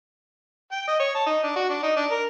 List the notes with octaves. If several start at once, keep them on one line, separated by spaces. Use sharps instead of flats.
G5
D#5
C#5
A5
D#4
D4
F#4
D4
D#4
D4
A#4